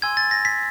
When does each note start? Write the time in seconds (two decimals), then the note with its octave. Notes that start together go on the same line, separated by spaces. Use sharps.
0.02 G#5 C6 E6 G#6
0.17 A6
0.31 A#6
0.45 B6